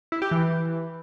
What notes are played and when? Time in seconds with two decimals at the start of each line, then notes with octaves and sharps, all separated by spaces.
0.12 E4
0.22 G4
0.31 E3